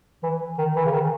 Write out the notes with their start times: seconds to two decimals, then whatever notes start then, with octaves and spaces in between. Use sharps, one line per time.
0.23 E3
0.58 D#3
0.76 E3
0.85 C#3
0.93 D#3